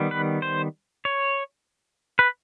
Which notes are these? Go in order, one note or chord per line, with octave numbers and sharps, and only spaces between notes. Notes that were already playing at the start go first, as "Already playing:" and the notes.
Already playing: D#3 G3 B3
B4
C5
C#5
B4